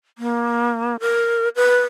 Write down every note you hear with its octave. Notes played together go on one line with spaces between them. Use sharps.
A#3
A#4
B4